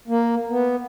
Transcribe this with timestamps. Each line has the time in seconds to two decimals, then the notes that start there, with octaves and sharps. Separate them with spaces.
0.08 A#3
0.49 B3